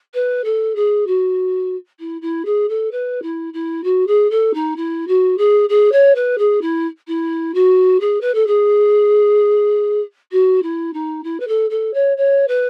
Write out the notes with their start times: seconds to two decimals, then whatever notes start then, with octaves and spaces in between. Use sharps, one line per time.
0.14 B4
0.44 A4
0.75 G#4
1.07 F#4
1.99 E4
2.22 E4
2.45 G#4
2.69 A4
2.91 B4
3.22 E4
3.53 E4
3.84 F#4
4.07 G#4
4.30 A4
4.54 D#4
4.76 E4
5.07 F#4
5.38 G#4
5.69 G#4
5.92 C#5
6.15 B4
6.38 G#4
6.61 E4
7.07 E4
7.54 F#4
8.00 G#4
8.21 B4
8.34 A4
8.47 G#4
10.32 F#4
10.63 E4
10.93 D#4
11.24 E4
11.40 B4
11.48 A4
11.70 A4
11.94 C#5
12.17 C#5
12.48 B4